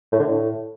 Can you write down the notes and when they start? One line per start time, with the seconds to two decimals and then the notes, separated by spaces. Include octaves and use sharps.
0.12 A2
0.19 D3
0.27 A2